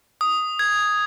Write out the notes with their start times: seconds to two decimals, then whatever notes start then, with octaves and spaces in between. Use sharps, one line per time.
0.21 D#6
0.59 G#6